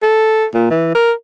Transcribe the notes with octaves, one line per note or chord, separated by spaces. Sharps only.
A4
A#2
E3
A#4